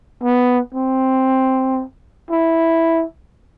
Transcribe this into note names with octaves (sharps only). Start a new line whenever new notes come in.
B3
C4
E4